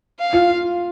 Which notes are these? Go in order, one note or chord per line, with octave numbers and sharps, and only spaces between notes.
F5
F4